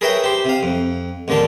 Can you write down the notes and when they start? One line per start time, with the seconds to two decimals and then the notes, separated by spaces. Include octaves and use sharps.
0.01 G#4 A#4 B4 C#5 E5 G5
0.24 G4 C5
0.45 C3 F5
0.63 F2
1.28 A1 D#2 D3 A#3 A4